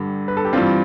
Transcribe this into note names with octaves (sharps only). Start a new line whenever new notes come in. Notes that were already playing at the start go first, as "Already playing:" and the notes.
Already playing: G2 D3 G3
B4
A4
G4
G2 E3 G3 C4 F4